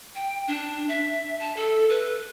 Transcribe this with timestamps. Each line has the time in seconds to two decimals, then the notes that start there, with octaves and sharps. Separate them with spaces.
0.15 G5
0.48 D4
0.89 E5
1.40 A5
1.57 A4
1.90 B4